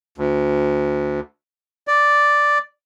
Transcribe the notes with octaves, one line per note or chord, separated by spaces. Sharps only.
D2
D5